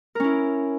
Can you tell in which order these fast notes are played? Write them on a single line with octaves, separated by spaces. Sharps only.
A#4 C#4 E4